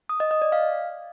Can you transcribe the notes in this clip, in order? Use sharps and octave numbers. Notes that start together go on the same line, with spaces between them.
D#6
D#5
D#5
D5
F5